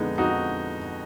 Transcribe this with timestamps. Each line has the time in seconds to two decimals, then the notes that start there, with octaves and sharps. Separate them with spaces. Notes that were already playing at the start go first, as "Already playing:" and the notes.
Already playing: F2 D3 G#3 B3 D#4
0.18 F2 D#4 F#4